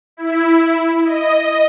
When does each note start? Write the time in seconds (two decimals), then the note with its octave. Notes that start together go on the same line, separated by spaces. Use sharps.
0.17 E4
1.05 D#5